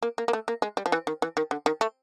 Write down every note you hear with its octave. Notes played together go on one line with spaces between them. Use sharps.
A#3
A#3
A#3
A3
A#3
G#3
G3
F3
E3
D#3
E3
D#3
D3
D#3
A3